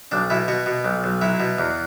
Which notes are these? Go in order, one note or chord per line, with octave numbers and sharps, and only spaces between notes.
B1 D4
B2 E4
B2 F#4
B2
B1
B1
F#3 E4
B2
E2